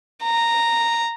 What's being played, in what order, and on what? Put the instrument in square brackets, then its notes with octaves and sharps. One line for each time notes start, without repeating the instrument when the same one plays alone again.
[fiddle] A#5